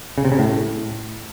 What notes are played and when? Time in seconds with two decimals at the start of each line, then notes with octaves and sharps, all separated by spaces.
0.18 C#3
0.25 C3
0.32 C#3
0.39 A2